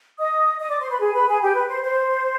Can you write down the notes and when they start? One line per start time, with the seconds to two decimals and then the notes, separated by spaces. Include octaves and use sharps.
0.19 D#5 D#6
0.60 D#5 D#6
0.70 D5 D6
0.80 C5 C6
0.90 B4 B5
1.00 G#4 G#5
1.15 B4 B5
1.28 G#4 G#5
1.42 G4 G5
1.55 B4
1.69 C5
1.83 C5